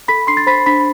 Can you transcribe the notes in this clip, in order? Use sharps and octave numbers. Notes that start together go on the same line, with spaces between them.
A4 B5 B6
D4 C6 C7
A6
C5 B5 B6
D4 B5 B6